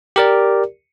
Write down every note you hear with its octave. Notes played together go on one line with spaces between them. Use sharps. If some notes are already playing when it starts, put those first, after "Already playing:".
G4 A#4 D5